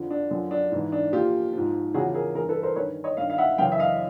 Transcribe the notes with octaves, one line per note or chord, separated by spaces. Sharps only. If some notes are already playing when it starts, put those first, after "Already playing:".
Already playing: F2 D3 F3
D4
F#2 D3 F3
D4
G#2 E3
D4
A#2 F3 F4 G4
G#2 F3
E2 C#3 F3 F#4 G#4
G#4 A#4
G2 E3 G#4 A#4
A4 B4
A#4 C5
G2 D#3 B4 C#5
C#5 D#5
G2 D#3 D#5 F5
F5
E5 F#5
F#2 C#3 E3 F5 G5
E5
D#5 F5